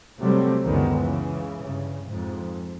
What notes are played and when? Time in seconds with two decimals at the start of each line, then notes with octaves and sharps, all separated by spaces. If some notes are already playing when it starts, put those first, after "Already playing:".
0.19 C3 F#3 G3 A3 C4
0.65 C#2 F#2 D3 D#3 G#3 B3
1.00 C#3 E3
1.60 G2 C#3
2.09 F2 G#2